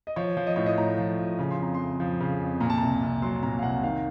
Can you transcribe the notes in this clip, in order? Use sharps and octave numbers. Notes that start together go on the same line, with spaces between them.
D#5
F3 C#5
F3
D#5
A2 C#5
D#5
A2 A#5
F3
F3
C#3
C6
F2 A#5
C6
F2
F3
C#3
F2
A#2 A#5
A5
C2 A#5
C2
F#3 C6
A#2 A#5
F5
C2 F#5
D#3 F5